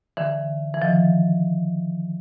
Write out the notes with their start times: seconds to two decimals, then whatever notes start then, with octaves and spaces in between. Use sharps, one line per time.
0.17 D3 E3
0.74 E3
0.82 D#3 F3